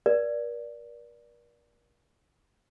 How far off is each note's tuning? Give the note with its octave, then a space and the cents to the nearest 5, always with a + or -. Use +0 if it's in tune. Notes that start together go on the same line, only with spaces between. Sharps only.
A#4 +40 D5 +0